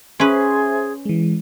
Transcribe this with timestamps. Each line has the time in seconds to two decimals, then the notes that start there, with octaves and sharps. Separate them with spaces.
0.20 C#4 G#4 B4 C5 E5 C6
1.05 E3 G#3